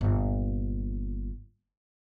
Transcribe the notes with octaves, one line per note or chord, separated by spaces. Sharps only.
G1 A#2